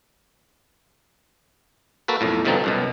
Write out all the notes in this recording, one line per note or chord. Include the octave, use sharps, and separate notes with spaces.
A#3 F#4 A4 B4
B1 F2 A2
G2 B2 D3 F3 C4 D#4
C2 F#2 B2